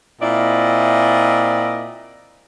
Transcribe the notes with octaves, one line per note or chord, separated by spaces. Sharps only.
A#2 C4 E4 D5 D#5